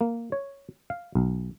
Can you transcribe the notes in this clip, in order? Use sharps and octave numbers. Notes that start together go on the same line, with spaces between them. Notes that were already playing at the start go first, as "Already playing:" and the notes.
A#3
C#5
F5
B1